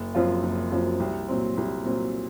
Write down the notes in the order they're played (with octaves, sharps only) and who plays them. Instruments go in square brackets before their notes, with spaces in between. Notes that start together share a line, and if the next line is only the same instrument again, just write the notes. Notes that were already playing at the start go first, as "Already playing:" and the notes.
Already playing: [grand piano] F#1
F#2 F3 C4 F4
F#1
F#2 F3 C4 F4
C2
A#2 F#3 C4
C2
A#2 F#3 C4